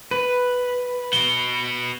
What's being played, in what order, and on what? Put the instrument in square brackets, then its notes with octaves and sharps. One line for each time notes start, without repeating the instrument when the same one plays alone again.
[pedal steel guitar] B4
[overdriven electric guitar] B3 F#4 [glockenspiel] G7